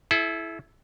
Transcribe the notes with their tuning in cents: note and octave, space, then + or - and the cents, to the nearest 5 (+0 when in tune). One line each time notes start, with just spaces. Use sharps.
E4 +0 A4 -40